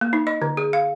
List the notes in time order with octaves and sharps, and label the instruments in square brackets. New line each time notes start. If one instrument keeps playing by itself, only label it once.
[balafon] A#3
D#4
D#5
D3
G#4
F5